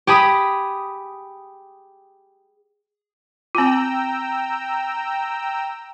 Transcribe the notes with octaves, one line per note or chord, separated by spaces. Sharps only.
G4 G#4 B5 D#6
C4 F4 G5 A#5 E6